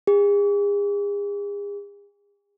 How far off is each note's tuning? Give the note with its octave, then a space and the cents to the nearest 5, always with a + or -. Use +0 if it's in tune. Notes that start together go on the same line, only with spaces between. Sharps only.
G#4 -40